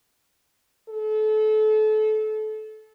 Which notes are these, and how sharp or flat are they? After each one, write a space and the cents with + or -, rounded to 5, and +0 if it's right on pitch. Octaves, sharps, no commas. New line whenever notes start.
A4 -30